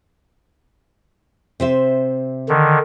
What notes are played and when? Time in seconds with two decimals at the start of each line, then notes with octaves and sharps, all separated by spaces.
1.60 C3 C5 E5
2.49 D3 D#3